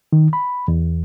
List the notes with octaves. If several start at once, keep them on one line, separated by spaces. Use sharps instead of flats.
D#3
B5
E2